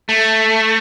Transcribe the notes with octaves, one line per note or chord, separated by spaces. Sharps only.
A3